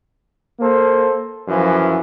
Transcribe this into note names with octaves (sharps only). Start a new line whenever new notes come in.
A#3 A4 C5
F#2 E3 F3